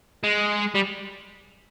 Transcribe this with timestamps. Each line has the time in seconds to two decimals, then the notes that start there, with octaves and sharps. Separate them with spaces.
0.23 G#3
0.75 G3